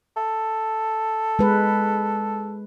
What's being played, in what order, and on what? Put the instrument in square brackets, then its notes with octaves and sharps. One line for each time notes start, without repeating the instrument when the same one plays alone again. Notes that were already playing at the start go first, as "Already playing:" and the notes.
[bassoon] A4
[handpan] G#3 B4